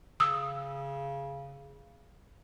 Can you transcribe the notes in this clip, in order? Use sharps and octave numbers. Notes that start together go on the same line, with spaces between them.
C#3 D#6 E6